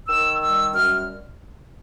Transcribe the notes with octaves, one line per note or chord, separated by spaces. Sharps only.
D#3 E6
G3 E6
F#2 F6